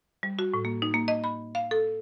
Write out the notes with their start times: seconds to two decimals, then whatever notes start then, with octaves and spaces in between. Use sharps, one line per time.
0.23 G3
0.39 F#4
0.54 A2
0.65 A#3
0.82 D#4
0.94 A#3
1.08 D#5
1.24 B5
1.55 F5
1.71 A4